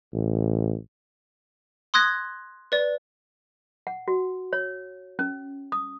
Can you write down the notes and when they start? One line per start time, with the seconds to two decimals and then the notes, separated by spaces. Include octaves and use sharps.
0.14 A1
1.94 C6 D#6 F#6 G#6 A#6
2.72 B4 D5
3.87 F#5
4.08 F#4
4.53 C#5
5.19 C#4
5.72 D#6